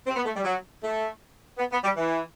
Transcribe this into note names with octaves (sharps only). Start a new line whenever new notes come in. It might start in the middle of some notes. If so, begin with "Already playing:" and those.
C4
B3
A3
G3
F#3
A3
B3
B3
G3
E3